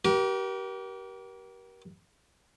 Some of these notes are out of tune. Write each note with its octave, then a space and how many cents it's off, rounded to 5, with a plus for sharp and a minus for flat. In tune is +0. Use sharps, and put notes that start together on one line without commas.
G4 -30 A#4 +35